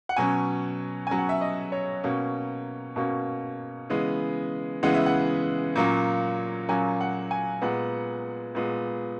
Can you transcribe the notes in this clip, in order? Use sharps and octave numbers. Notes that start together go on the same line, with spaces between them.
F#5
B2 F#3 C#4 G#5
B2 F#3 C#4 G#5
F#5
E5
D#5
C#5
B2 A#3 C#4
B2 A#3 C#4
C#3 E3 G#3 B3
C#3 E3 G#3 B3 F#5
E5
F#5
A#2 F#3 A#3 C#4
A#2 F#3 A#3 C#4 G#5
F#5
G#5
A#2 G#3 B3 F#5
A#2 G#3 B3